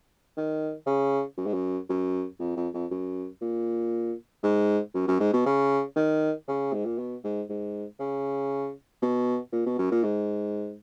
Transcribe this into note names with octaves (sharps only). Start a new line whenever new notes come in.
D#3
C#3
F#2
G#2
F#2
F#2
F2
F2
F2
F#2
A#2
G#2
F#2
F#2
G#2
B2
C#3
D#3
C#3
G#2
A#2
B2
G#2
G#2
C#3
B2
A#2
B2
F#2
A#2
G#2